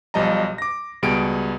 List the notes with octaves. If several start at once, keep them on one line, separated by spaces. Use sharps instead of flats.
B1 F3 G3 D#5 A5 A#5
D6 A#6
C#2 B2 G3 G#4 D7